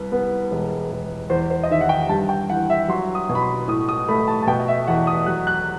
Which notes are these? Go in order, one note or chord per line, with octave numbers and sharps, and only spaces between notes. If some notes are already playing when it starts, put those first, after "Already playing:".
Already playing: C2 B4
B3
E1
E1
E2 C5
C5
D#5
D#3 E5
F#5
G5
G2 A5
G5
E3 F#5
E5
F#3 C6
D#6
B2
B5
C6
A2 D#6
D#6
A3 B5
A5
A5
B2 G5
D#5
E5
E2 F#5
D#6
F#3 F#6
F#6